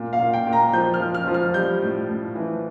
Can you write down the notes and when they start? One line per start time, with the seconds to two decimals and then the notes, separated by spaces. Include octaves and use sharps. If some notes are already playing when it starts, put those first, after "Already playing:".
Already playing: A#2
0.13 F5
0.19 A#2
0.33 G5
0.47 A#2
0.53 A#5
0.73 F3 G6
0.94 F6
1.00 F3
1.15 F6
1.28 F3
1.34 F6
1.54 G3 G6
1.82 A2
2.08 A2
2.35 E3